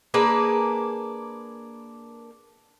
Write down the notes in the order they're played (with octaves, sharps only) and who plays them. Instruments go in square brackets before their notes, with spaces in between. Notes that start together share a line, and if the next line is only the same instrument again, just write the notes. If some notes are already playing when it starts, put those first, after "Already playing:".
[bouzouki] A#3 D4 G#4 B4